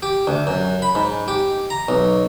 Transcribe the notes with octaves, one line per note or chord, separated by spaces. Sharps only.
G4
D2
F#2
B5
G#2
G4
A#5
B1